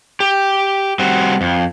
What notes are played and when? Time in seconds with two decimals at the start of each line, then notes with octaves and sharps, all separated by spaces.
0.20 G4
0.99 G3 C4 F#4
1.41 F2